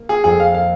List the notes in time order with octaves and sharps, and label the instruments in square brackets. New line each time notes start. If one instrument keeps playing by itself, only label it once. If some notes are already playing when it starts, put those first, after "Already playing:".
Already playing: [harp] A#3
[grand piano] G#4
[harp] F2 [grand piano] G#4
[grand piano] F5
[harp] A#3 [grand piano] F5